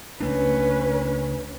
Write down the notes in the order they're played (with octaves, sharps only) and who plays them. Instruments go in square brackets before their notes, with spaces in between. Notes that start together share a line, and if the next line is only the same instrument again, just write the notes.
[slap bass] C#2 A3 D4 [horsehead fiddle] C#4 B4